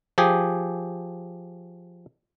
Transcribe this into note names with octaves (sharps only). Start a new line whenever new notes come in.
F3 G4 G#4